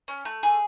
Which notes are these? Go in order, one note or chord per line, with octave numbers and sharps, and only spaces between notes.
C#4
A3
G#4